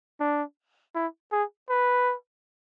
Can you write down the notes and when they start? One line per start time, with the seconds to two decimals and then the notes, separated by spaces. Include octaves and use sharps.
0.20 D4
0.95 E4
1.32 G#4
1.69 B4